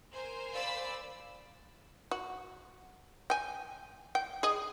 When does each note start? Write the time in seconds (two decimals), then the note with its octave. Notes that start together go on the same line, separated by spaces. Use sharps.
0.14 A#4 C5 G#5
0.54 D5 F5 B5 E6
2.11 F#4
3.30 G5 G#5
4.15 G5
4.43 G#4 D#5